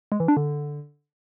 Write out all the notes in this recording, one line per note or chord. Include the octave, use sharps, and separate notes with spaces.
G#3
E3
D4
D3